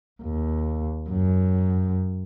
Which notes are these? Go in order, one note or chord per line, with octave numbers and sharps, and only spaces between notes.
D#2
F#2